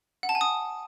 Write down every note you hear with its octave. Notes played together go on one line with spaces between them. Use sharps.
F#5
A5
G#5
D#6